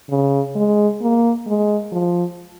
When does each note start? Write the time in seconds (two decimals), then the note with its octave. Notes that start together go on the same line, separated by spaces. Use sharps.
0.10 C#3
0.56 G#3
1.01 A#3
1.47 G#3
1.92 F3